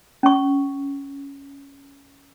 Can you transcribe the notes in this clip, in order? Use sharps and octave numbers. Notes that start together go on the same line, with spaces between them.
C#4 C#6